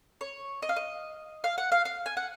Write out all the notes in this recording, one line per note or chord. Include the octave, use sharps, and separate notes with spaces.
C#5
D#5
F5
D#5
F5
F#5
F5
F5
G#5
F#5